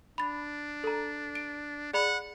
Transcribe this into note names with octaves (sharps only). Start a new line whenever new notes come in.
D4 B5 A6
A4 A#5
D7
G#4 D5 F#5 B5